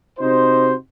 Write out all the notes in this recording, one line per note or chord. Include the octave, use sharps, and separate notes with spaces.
C3 D#4 F#4 C5